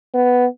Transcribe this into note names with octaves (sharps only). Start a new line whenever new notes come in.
B3